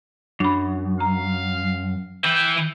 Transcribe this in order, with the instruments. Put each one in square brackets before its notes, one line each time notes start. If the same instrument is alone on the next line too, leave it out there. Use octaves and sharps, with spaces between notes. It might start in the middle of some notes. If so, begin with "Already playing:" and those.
[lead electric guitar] F#2 [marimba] D4 B5
[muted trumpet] F5 [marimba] A#5
[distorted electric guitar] E3 E4 [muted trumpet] G5